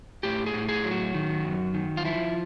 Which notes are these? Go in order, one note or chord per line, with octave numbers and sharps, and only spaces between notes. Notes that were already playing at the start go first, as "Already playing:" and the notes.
A2 G4
G#4
A2
G#4
F#3
F#4
D#3
F#2
D#3
F4
F3 E4